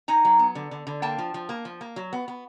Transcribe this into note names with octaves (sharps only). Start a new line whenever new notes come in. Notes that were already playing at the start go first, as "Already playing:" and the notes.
D#4 G#5 A#5
F#3
B3
D3
D3
D3
A#3 G5 A5
F3
F3
A#3
F3
A#3
F#3
B3
B3